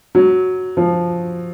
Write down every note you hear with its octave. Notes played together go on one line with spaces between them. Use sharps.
F#3
F3